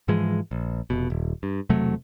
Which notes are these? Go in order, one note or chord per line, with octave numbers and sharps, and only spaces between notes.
G#2 E3 F3 G#3
A#1
F1 B2
D#1
G2
E1 C3 F#3 A3